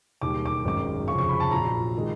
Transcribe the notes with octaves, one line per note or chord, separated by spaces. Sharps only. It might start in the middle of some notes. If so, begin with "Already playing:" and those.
E1 D#2 D#3 G3 D6
D6
G#1 F#2 D#3 G#3 D6
F1 F2 C#3 C#6
C#6
B5
A5
A#1 A#2 F#3 A#5
D#3 G#3